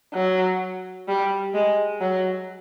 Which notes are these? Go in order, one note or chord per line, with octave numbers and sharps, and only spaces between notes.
F#3
G3
G#3
F#3